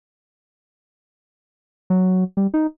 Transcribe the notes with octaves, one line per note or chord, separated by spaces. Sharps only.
F#3
G3
D#4